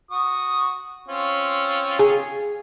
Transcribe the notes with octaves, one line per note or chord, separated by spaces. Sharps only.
F#4 C#6 D#6
C4 C#4 F4
G#4